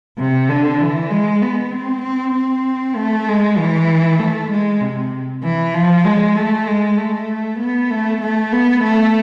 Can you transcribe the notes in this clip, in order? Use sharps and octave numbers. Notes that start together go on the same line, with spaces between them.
C3
D3
E3
G#3
B3
C4
C4
C4
A3
G#3
E3
A3
G#3
C3
E3
F3
G#3
A3
G#3
A3
B3
A3
A3
B3
A3